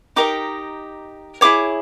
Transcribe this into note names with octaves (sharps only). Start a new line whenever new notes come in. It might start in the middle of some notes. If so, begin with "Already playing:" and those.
D#4 G4 A#4 D#5 D6
E4 G#4 C#5 D6